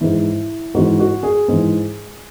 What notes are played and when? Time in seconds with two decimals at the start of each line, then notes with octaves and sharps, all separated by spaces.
0.01 G#2 E3 E4
0.74 G#2 E3 F#4
0.99 F#4
1.23 G#4
1.48 G#2 E3